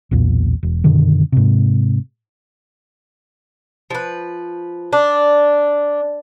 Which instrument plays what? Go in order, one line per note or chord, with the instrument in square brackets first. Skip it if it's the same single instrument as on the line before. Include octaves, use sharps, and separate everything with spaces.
[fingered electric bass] B1 E2 A#2
E1
F#2 B2 D3 D#3
G#2 C3
[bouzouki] F3 B4
D4